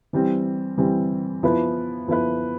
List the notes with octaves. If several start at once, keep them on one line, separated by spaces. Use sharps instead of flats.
E3 G3 C4
E3 G3 C4
F3 B3 E4 B4
F3 B3 E4 B4